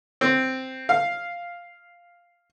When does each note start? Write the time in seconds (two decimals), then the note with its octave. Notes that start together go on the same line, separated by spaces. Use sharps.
0.21 C4
0.89 F5